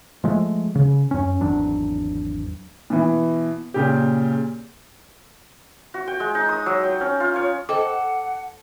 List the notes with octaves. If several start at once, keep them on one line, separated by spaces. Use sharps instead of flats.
F3 G#3 A3
C#3
F#2 C#4
G#1 E2 F#3 D4
B2 E3
A#2 C#3 G4
F#4
G5
G#3
D#4
D#6
F#3
G5
C#4
F4
C#5
A4 C5 D#5 F#5 G5 D6